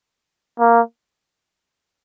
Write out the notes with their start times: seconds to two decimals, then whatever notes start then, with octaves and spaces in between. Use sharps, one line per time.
0.59 A#3